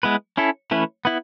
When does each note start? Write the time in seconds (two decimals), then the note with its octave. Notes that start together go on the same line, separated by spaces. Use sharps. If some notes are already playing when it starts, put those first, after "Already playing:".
0.03 G#3 B3 E4 B4
0.37 C#4 E4 A4
0.71 E3 A3 C#4 E4 B4
1.05 B3 E4